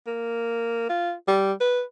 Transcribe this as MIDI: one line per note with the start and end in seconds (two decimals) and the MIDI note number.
0.07 0.89 58
0.89 1.13 65
1.28 1.53 55
1.61 1.82 71